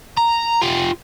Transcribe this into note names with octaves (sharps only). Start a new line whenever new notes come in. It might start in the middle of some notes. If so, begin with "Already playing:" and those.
A#5
F4 G4